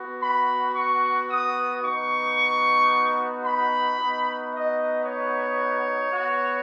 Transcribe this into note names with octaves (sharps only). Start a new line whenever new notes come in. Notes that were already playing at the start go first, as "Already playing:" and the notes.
Already playing: B3 F#4
B5
C#6
D#6
B3 D#4 F#4 C#6
B5
B3 D#4 F#4
D#5
C#5
B3 F#4